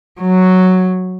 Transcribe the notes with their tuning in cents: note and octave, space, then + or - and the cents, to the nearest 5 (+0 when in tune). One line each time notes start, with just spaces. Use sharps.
F#3 +0